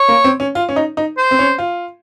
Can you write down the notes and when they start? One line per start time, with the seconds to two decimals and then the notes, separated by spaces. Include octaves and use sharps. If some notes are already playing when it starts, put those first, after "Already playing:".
Already playing: C#5
0.08 A#3
0.24 C4
0.40 C#4
0.55 F4
0.69 C#4
0.76 D#4
0.97 D#4
1.18 C5
1.31 C4
1.39 C#4
1.58 F4